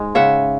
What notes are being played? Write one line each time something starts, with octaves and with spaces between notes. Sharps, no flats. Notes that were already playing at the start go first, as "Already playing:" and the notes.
Already playing: G#2 G#3
C#3 E5 F#5